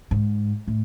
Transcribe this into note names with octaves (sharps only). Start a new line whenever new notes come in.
G#2
A2